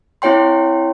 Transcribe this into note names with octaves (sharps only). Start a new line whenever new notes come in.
C4 E4 C#5 G5 C6